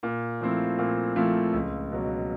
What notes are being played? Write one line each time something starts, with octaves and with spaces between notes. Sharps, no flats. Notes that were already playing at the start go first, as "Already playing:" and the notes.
A#2
F3 A3 C4 E4
A#2
F3 A3 C4 E4
C#2
B2 F#3